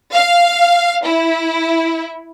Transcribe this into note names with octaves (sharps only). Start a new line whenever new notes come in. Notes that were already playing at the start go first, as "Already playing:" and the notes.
F5
E4